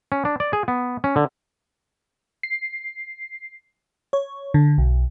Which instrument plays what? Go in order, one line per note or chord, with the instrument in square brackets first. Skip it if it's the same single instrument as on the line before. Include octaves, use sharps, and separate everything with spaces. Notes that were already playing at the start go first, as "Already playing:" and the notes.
[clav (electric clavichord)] C#4
D4
D5
G#4
B3
C#4
D3
[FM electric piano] C7
C#5
D3
B1